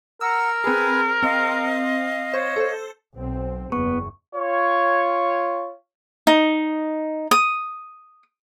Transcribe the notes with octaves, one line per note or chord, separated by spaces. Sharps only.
A#4 F#5 A#5 E6
C4 G#4 B4 G#5 B5
C4 D#5 F5
C5 C#5
A4 C5
B1 C4
F#1 E2 B3 C#6
F4 C#5
D#4
D#6